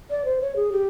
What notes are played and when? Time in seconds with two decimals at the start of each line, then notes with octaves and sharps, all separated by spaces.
0.10 D5
0.25 C5
0.41 C#5
0.56 G#4
0.72 G4